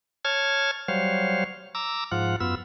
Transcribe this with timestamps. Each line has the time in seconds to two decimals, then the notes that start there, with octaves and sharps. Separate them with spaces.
0.25 C#5 A5 F6 G#6
0.88 F#3 G3 C5 C#5 F5
1.75 A#5 D6 E6
2.12 G#2 F3 F4 F#5
2.40 F#2 B3 F4 E6